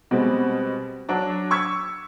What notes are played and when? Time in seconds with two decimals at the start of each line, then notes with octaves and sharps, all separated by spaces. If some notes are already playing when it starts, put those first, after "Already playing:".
0.11 B2 G3 G#3 C4
1.09 F#3 D4
1.51 C#6 E6 G#6 B6